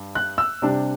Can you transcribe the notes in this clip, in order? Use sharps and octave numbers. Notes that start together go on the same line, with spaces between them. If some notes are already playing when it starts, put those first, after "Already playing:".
Already playing: G2
F#6
E6
C3 G3 D4